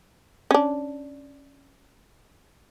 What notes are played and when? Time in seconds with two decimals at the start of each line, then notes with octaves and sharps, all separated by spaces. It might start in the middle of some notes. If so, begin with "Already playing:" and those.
0.51 C#4 D4